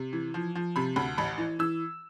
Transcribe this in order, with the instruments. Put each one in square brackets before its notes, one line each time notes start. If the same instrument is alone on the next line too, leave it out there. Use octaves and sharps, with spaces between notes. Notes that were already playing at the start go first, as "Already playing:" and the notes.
Already playing: [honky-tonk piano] C3
E3
F3
F3
C3 B5
D2 B5
A1 B5
E3
E3 E6